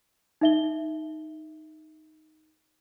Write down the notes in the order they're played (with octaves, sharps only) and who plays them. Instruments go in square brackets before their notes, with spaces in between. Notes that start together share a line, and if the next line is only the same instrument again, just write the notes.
[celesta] D#4 E5 G7